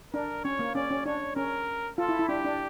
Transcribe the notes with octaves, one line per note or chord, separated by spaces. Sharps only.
D4 A#4
C#4 C#5
A#3
C#4 D5
C#4
D4 C#5
C#4 A#4
F4 A4
E4
E4
D4 G4
D4